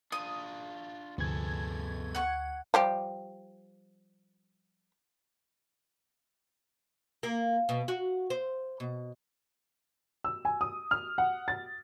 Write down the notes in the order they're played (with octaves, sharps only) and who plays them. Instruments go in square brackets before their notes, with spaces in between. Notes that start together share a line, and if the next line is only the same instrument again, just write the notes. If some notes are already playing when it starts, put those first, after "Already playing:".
[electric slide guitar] D4 F4 [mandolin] D#6
[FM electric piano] D2 G#6 [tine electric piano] G2 C3 F3 [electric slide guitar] B3 G#4 A4
[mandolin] F#5 C#6
[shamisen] F3 G3 G4
[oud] A#3
B2
F#4
C5
B2
[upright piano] E6
G#5
D#6
F6
F#5
A6